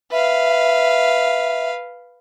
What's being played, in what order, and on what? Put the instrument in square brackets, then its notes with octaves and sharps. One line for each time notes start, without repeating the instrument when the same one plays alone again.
[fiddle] B4 F5 [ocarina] E5